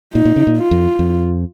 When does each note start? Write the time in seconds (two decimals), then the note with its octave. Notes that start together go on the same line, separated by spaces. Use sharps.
0.14 A#2 D#4
0.25 A#2
0.36 C#3
0.47 A#2
0.57 F4
0.71 F2
0.99 F2